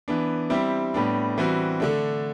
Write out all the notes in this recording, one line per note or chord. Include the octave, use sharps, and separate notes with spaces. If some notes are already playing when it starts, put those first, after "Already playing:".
E3 B3 D4
G3 C4 E4 G4
A2 G3 B3 D4
E3 G3 C4 F#4
D3 A3 D4